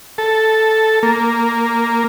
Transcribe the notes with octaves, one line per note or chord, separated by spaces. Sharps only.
A4
A#3